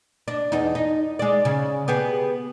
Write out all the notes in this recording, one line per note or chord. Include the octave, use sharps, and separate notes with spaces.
D4
E2 D#4
D#4
G#3 D5
C#3
B3 G4 G#4